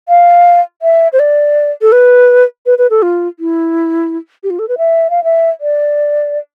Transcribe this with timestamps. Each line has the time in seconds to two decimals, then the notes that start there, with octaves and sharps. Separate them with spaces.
0.09 F5
0.82 E5
1.13 C5
1.19 D5
1.82 A4
1.92 B4
2.66 B4
2.78 B4
2.90 A4
3.02 F4
3.39 E4
4.44 G4
4.50 F4
4.59 A4
4.69 B4
4.78 E5
5.10 F5
5.24 E5
5.61 D5